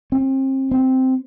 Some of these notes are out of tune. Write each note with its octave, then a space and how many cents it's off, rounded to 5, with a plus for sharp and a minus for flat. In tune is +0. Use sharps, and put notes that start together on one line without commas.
C4 +35
C4 -5